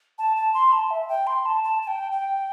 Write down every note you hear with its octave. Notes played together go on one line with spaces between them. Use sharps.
A5
A5
C6
A5
E5
G5
C6
A5
A5
A5
G5
G5